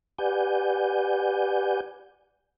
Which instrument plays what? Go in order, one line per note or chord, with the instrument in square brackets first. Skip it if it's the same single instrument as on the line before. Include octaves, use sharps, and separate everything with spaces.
[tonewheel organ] G4 B4 D5 F#5 G#5 G6